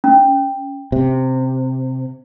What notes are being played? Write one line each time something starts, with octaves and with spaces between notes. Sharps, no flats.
C#4
C3